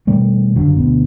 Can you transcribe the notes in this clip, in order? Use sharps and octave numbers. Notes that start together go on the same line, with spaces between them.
B2 D#3 G3 A3
F#1 D3 F#3
D2 B2